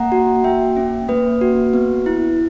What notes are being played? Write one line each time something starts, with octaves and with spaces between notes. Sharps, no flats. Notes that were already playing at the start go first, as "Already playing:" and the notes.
Already playing: A#3 F#5 A#5
F#4
A#3 E5 G5
C#4
A#3 B4
F#4
B3
E4